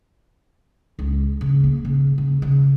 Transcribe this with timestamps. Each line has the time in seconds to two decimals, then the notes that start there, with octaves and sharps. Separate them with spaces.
0.99 C#2
1.41 C#3
1.64 A#3
1.85 C#3
2.18 C#3
2.42 C#3